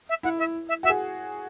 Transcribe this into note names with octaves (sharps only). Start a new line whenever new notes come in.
E5
E4 F#5
E5
E5
F#4 E5
G#4